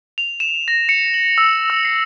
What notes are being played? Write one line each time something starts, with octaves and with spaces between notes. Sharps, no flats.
F7
E7
A#6
C#7
F#7
E6
E6
C7